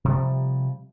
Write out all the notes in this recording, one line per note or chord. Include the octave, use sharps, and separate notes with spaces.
C3 F3 G3